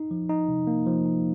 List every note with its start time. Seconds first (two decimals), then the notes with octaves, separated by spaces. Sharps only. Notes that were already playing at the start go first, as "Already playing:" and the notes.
Already playing: D#4
0.11 F3
0.29 D#4
0.48 C3
0.67 A#3
0.86 F3
1.06 D#4